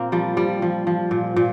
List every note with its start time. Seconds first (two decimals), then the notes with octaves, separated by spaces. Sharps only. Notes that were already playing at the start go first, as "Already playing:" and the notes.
Already playing: A#2 A#3 C4
0.12 F3 G3
0.37 F3 G3
0.62 F3
0.87 F3
1.11 A#2
1.36 A#2